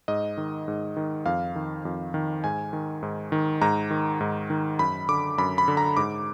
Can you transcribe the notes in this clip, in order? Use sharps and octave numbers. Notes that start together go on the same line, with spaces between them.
G#2 D#5
D#3
G#2
D#3
F2 F5
D#3
F2
D#3
G#2 G#5
D#3
G#2
D#3
G#2 A#5
D#3
G#2
D#3
F#2 B5
D3 D6
F#2 B5
B5
D3
A#5
G#2 D6